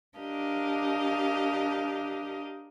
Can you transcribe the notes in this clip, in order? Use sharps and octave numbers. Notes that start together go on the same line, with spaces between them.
D4 G4 A#4 D#5 F5